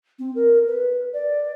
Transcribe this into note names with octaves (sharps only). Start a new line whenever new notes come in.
C4
A#4
B4
D5